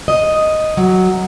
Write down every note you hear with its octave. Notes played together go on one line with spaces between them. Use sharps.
D#5
F#3